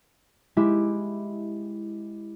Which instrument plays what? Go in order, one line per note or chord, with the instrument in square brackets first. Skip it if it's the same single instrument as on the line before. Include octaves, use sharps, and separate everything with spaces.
[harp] G#3 E4 G4